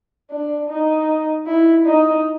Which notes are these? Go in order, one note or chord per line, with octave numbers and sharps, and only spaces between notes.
D4
D#4
E4
D#4